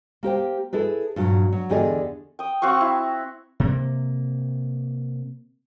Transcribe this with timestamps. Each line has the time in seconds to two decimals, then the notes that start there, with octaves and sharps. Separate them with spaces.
0.23 A#3 G4 C5 G5
0.73 E4 G#4 A4 B4
1.16 G2 A#2 F#3
1.52 F#3
1.70 E2 D3 G4 G#4 D5 D#5
2.39 G5 D#6
2.62 C4 F#4 F5 C#6
2.81 E4
3.60 C3 A#3